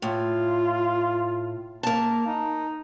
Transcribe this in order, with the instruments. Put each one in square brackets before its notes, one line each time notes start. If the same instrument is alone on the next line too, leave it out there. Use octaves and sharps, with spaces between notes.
[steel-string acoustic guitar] A2 [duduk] F4
[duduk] A#3 [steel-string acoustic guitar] A#4 A5
[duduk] D#4